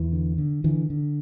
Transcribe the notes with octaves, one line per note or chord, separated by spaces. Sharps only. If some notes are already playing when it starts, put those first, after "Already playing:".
Already playing: E2 E3
D3
D3
D3 E3
D3